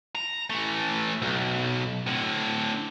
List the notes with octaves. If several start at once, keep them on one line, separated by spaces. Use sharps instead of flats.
A#5
E3 A3
B1
A2 D3